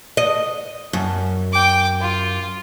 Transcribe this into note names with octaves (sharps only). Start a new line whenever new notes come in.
D#5
F#2
G5 D6
F4